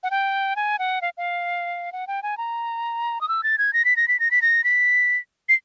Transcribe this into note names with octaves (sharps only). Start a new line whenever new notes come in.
F#5
G5
G#5
F#5
F5
F5
F#5
G5
G#5
A#5
D#6
E6
A6
G#6
A#6
B6
A#6
B6
A#6
B6
A#6
B6
C7